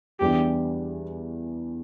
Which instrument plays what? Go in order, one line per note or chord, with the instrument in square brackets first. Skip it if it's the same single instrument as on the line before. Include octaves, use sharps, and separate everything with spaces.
[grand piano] E2 E3 G3 D4 [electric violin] G4